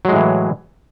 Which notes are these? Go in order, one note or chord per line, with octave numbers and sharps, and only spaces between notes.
A2 E3 F#3 G#3